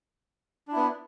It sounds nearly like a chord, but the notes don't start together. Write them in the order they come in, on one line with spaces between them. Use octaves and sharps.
D4 E4 B3